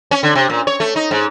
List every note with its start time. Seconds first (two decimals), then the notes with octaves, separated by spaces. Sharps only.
0.11 C#4
0.23 D3
0.35 C3
0.50 A#2
0.67 C#5
0.80 A3
0.96 D#4
1.11 G#2